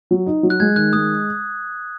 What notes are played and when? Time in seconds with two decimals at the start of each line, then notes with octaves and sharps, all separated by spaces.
0.11 F#3
0.26 D#4
0.43 F#3
0.50 F#6
0.60 G#3 G#6
0.76 D#3 F#6
0.93 G#3 D#6